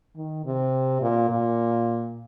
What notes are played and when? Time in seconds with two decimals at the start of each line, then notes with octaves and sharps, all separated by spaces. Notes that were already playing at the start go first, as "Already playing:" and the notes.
0.17 D#3
0.45 C3
1.02 A#2
1.30 A#2